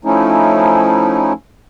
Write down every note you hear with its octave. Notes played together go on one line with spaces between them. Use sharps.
F3 A3 C#4 D#4 E4